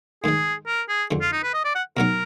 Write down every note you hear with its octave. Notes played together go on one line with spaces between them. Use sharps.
G#2 D#3 G#3 G#4
A#4
G#4
F2 D3 G#3
F4
D#4
B4
D#5
D5
F#5
B2 F#3 B3 D#4 A#4